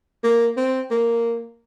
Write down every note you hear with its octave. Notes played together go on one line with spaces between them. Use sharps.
A#3
C4
A#3